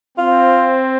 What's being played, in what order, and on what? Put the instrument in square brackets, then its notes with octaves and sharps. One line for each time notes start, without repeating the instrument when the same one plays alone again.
[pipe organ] C4 [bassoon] F4